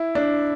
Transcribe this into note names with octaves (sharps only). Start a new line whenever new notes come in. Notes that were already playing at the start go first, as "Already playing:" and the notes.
Already playing: E4
D4